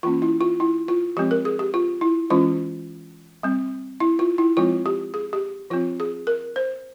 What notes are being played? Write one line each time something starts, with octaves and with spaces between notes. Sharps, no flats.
E3 A#3 C#4 F4
E4
F4
E4
F4
F3 G#3 C4 G4
A#4
G#4
G4
F4
E4
E3 G#3 C#4 F4
G3 C4
E4
F4
E4
F3 G#3 C4 F4
G4
G#4
G4
F3 C4 F4
G#4
A#4
C5